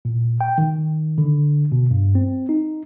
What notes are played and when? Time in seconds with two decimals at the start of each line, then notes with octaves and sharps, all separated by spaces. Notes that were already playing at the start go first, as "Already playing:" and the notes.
0.05 A#2
0.41 G5
0.58 D#3
1.18 D3
1.72 B2
1.91 G2
2.15 C4
2.49 D#4